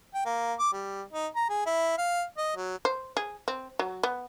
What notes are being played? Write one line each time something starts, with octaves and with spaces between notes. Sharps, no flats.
G5
A#3
D6
G3
D#4
A#5
G#4
E4
F5
D#5
F#3
C5
G#4
C4
F#3
B3